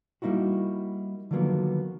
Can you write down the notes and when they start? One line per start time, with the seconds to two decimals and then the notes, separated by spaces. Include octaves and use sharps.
0.22 G3 A#3 D#4 E4 F#4
1.31 D3 D#3 F3 F#3 A#3 B3